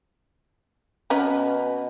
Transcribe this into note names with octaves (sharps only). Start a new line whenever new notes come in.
B2 C#4 B4 A#5